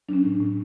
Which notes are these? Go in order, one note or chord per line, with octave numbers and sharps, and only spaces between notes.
F#3 C#4 D4
A2
A2